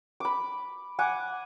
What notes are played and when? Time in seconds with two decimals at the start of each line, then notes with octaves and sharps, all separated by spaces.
0.20 B5 D6
0.99 F#5 G#5 D6